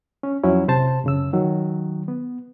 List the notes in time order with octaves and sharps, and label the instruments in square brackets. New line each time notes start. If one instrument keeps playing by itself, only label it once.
[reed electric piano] C#4
F2 F#3 C#4 E4
C3 C5 A5
F#2 C#3 E6
D#3 F#3
B3